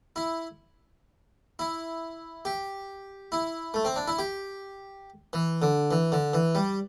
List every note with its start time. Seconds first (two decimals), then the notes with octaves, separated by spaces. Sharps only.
0.16 E4
1.59 E4
2.45 G4
3.32 E4
3.74 A3
3.85 C4
3.96 D4
4.07 E4
4.19 G4
5.33 E3
5.62 D3
5.91 E3
6.12 D3
6.33 E3
6.55 G3